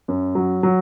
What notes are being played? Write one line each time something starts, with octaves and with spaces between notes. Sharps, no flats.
F#2
F#3
F#3